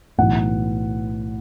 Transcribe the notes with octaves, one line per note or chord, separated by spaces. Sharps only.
B1 A2 E3 F#5